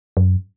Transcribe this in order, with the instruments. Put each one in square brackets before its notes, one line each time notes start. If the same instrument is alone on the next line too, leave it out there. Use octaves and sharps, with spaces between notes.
[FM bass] F#2